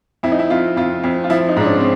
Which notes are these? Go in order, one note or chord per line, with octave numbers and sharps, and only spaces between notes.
F2 E4
D#4
E4
F2 F4
F2 F4
F2
F4
F3 E4
D#4
G#2 D4
C#4
C4